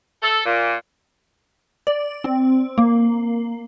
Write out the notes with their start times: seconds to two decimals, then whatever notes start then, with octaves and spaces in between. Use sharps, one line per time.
0.23 A4
0.46 A#2
1.87 D5
2.24 C4
2.78 A#3